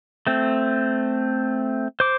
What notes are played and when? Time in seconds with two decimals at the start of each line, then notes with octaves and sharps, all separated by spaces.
0.27 A3 C4
2.00 C5 D6